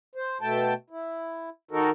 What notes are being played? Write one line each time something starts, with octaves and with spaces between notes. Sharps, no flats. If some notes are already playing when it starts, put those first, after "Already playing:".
C5
B2 A3 G5 A5
E4
D#3 D#4 F#4 A4 A#4